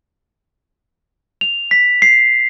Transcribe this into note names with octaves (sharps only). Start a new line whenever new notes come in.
F7
B6
C7